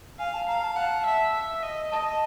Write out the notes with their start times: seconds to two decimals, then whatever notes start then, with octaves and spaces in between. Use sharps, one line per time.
0.19 F5 G#5
0.34 A5
0.48 F5 A#5
0.63 A5
0.76 F#5 A5
1.06 E5
1.34 E5
1.63 D#5
1.91 D#5 A5